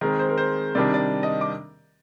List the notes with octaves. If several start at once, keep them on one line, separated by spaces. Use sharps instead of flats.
D#3 G#3 C4 A#4
C5
A#4
C5
C3 D#3 G3 D4 D5
D5
D#5
D6